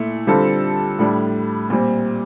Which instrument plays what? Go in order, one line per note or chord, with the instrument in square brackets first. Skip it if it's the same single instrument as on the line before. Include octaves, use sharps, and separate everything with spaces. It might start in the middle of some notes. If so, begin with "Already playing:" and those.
Already playing: [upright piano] A#2 A3 E4
D3 G3 C4 F4 A4
A2 G3 D4
A#2 G3 C4